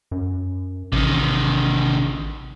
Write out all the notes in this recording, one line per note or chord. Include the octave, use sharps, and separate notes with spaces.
F#2
A1 C3 D#3